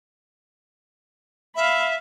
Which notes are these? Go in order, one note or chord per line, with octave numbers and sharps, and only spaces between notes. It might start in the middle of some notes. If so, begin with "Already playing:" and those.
E5 F5 B5